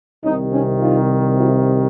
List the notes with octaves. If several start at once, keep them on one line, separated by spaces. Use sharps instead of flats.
C2 C3 D#3 C#4 D#4
C#4 D#4
D#4 F4
E4 F#4